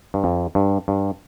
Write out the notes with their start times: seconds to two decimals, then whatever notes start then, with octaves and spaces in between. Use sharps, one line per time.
0.14 G2
0.24 F2
0.55 G2
0.88 G2